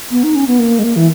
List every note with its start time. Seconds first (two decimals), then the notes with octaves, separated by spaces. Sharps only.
0.11 B3
0.24 D#4
0.35 C#4
0.47 B3
0.59 A#3
0.79 G#3
0.84 A#3
0.96 E3